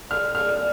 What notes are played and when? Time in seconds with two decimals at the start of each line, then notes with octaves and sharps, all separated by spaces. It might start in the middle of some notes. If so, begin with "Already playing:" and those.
0.11 D5 F6
0.35 F6